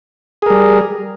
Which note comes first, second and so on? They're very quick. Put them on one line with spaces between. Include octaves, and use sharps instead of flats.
G#4 A#4 G3